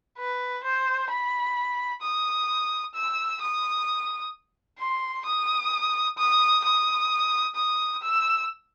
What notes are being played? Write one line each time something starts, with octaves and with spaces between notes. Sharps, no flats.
B4
C5
B5
D#6
E6
D#6
C6
D#6
D#6
D#6
D#6
E6